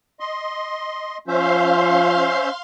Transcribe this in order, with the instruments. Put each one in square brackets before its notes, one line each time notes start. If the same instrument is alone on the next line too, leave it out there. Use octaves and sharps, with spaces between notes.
[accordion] D#5 C6
[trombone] F3 [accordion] C#4 C5 E5 [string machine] F5 C6